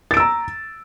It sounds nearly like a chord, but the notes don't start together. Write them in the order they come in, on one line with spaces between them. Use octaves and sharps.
A6 D7 E6 A#5